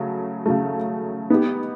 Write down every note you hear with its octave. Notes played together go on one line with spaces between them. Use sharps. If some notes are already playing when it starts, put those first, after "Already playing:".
Already playing: C#3 F#3 A3
C#3 F#3 A3
B3 D#4 G4